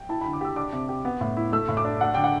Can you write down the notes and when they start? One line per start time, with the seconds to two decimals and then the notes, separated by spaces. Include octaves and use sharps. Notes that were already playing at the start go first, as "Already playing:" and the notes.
Already playing: G5
0.09 E4 A5
0.21 B5
0.25 D3
0.33 D6
0.41 G4 E6
0.56 D4 D6
0.73 C3
0.89 G4
1.05 B3
1.21 A2
1.37 E4
1.53 A3 E6
1.68 A2
1.77 D6
1.85 D4
2.00 D4 F#5
2.14 D3 G5
2.24 F#5